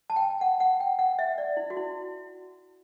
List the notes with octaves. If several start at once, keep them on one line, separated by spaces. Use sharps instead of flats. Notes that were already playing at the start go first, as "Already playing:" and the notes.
A5
G5
F#5
F#5
G5
F#5
E5
D5
E4
F#4
E4